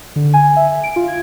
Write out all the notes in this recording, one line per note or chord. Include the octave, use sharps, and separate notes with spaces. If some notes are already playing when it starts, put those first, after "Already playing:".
D3
G#5
E5
D7
F4
G#6